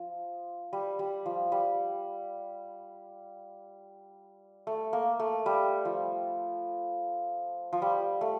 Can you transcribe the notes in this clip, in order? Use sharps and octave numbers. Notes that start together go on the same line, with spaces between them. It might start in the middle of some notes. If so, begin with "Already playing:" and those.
Already playing: F3
G3
G3
F3
G3
A3
A#3
A3
G3
F3
F3
G3
A3